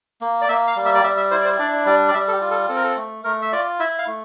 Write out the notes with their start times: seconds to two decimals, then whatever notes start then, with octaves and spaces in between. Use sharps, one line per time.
0.21 A#3
0.42 D5
0.49 A#3 E5
0.67 F5
0.76 G3
0.85 E5
0.95 D5
1.04 G3 E5
1.17 E5
1.31 E4 C5
1.41 D5
1.45 C5
1.59 D4 D5
1.86 G3 D5
2.08 D5
2.14 G3 E5
2.28 A4
2.33 G4
2.41 F4
2.51 A4
2.69 C4 A4
2.76 A#4
2.84 A4
2.96 A3
3.24 A3 A#4
3.42 E5
3.52 F4 D5
3.79 E4 E5
3.99 F5
4.07 A3